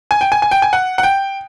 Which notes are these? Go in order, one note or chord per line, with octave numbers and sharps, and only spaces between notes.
G#5
G5
G#5
G#5
G5
G#5
F#5
F#5
G5